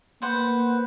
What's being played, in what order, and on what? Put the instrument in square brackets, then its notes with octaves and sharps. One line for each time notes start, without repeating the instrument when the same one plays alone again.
[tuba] A#3 [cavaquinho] B4 C5 F#5